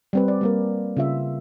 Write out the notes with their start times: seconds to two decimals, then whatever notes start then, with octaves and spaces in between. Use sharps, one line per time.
0.13 G3 C4 B4
0.28 D5
0.41 G3 A#3 A#4
0.97 C#3 F4 E5